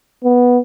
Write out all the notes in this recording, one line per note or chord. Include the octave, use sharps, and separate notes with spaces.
B3